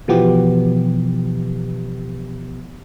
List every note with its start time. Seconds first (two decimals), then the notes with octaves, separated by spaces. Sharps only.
0.08 B2 E3 F3 B3 G4